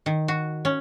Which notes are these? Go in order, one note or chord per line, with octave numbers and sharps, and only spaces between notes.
D#3
F#4
C#4